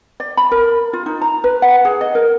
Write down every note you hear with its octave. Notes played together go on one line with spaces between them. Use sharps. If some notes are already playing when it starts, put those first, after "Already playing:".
D5
B5
A#4
F4
D#4
A#5
B4
F#5
G#4
D#5
A#4